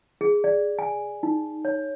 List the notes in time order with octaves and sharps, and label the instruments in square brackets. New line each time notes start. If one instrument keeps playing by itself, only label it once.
[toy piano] G#4
D5
G#5
D#4
C#5